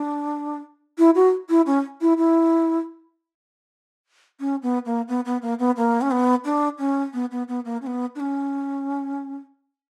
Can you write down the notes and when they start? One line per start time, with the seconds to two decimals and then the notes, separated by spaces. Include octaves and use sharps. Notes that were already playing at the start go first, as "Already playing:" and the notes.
Already playing: D4
0.98 E4
1.15 F#4
1.49 E4
1.66 C#4
2.01 E4
2.18 E4
4.40 C#4
4.63 B3
4.85 A#3
5.08 B3
5.25 B3
5.42 A#3
5.59 B3
5.77 A#3
6.01 C#4
6.11 B3
6.45 D4
6.79 C#4
7.13 B3
7.31 B3
7.48 B3
7.65 A#3
7.82 C#4
7.86 B3
8.15 D4
8.20 C#4